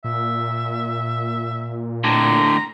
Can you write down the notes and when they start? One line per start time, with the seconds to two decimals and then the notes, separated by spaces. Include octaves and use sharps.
0.04 A#2 E5
2.04 A2 D3 A#5